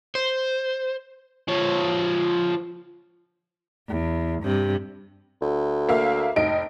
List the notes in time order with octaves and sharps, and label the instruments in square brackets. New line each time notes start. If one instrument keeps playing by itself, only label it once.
[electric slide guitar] C5
[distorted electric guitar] F3 C#5
[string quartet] E2
G2 C3
[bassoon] D2
[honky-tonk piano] A#3 E5 F5
F1 D#4 D7